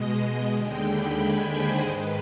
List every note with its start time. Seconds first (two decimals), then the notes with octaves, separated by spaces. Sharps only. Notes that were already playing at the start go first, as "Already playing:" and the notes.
Already playing: B2 G#3 D#5
0.54 D#2 D3 G#3 G5
0.86 B5
1.18 G#5
1.50 C5
1.82 G#2 D#3 G#3 B4